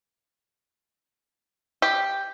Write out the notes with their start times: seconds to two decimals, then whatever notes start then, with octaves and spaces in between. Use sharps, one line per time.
1.82 G4